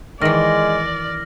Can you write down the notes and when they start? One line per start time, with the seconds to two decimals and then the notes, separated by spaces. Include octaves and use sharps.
0.21 D#3 E3 G#3 D5 F6 A#6 F#7